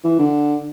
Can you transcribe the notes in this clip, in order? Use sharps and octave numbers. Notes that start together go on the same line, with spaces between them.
E3
D3